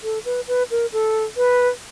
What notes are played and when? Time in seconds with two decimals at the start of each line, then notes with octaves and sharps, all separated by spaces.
0.03 A4
0.25 B4
0.48 B4
0.71 A#4
0.93 A4
1.37 B4